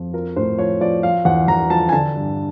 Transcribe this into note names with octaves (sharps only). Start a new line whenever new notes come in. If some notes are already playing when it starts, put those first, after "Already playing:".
Already playing: F2
F3 A#4
A2 C5
F3 C#5
F3 D5
F3 F5
E2 F#5
E2 A#5
F3 A5
G#5
D3 A5
G2